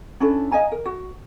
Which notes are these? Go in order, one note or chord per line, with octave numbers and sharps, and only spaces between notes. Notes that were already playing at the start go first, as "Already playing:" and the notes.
C#4 D4 E4 A4
D#5 F5 G#5 A#5
A#4
F#4